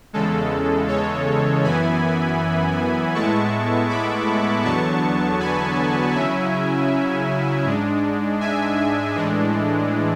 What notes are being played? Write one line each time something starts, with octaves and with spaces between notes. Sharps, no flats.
E2 C#3 G#3 A4
A4 C#5
F#2 E3 B3 E4 G#5 B5
A2 G#3 B3 E4 A5 C#6
B5 D6
E2 D3 F#3 B3 A5 C#6
G#5 B5
C#3 F#3 C#4 E4 E5 G#5
G#2 G#3 D4
E5 G#5
A2 E3 G#3 D4